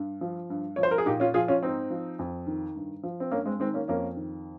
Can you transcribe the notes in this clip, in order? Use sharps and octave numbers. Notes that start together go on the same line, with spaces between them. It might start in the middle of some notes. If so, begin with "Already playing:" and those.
Already playing: G2
F3
G2
F3 C#5
C5
A#4
G#4
A#2 D#4 G4
C#4 F4
F3 F4 G#4
C#4 F4
G#2 C4 D#4
F3
F2
D#3
G2
F3
C4
G2 A#3 C#4
G#3 C4
D#3 G#3 C4
A#3 C#4
F2 A#3 C#4
D#3